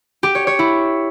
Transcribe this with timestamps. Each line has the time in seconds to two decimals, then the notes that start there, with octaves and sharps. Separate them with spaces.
0.23 G4
0.35 C#5
0.47 C#5
0.59 E4